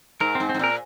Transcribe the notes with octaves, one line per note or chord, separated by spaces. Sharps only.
G#2 A#4
G#2 C4
C4
G#2
A#2 A#4